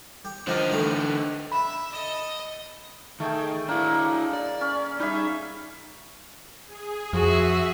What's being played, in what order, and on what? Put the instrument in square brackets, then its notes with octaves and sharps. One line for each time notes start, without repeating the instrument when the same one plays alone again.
[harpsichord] G4
[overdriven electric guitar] D3 D#4 [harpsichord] F3 G4 A#4
[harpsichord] E3 A3 G4
[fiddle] E5 [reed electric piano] B5
[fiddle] A4 D#5
[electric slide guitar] D#3 [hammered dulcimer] A3 G#4 G5
[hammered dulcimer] A#3 [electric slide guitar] D4 E4
[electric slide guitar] D5
[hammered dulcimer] C#4
[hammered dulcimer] G3 G#4 E5 [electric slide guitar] D#4
[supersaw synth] G#4
[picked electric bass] F2 [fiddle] F#4 G#4 [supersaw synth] E5